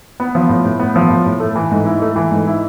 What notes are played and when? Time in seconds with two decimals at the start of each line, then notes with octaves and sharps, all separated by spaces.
0.20 B3
0.35 F3
0.49 A2
0.65 A2
0.80 B3
0.96 F3
1.10 A2
1.26 A2
1.40 A3
1.56 E3
1.71 G#2
1.86 E4
2.02 A3
2.16 E3
2.31 G#2
2.47 E4